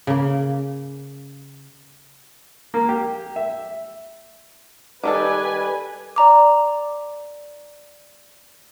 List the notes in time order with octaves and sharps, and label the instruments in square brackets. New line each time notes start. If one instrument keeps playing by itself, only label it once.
[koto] C#3 A#3
[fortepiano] A#3
G4
E5
[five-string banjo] D#3 D#4 A4 [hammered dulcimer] G3 D6 [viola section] B4 G#5
[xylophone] D5 A#5 D6